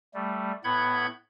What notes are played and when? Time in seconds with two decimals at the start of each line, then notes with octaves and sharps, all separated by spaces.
0.14 G3 A3
0.64 A2 B3 F#5 B5 G6 G#6